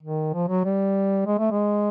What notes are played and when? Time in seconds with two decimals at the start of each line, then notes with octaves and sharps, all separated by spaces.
0.03 D#3
0.34 F3
0.49 F#3
0.65 G3
1.26 G#3
1.39 A3
1.51 G#3